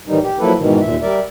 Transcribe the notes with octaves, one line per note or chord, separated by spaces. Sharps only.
A2 D#3 E3 G3 D#4
G4
F3 F#3 A#3 E4 A4 B4
G#2 B2 D#3 E3
D#2 A#2 E5
G3 A#4 D5 E5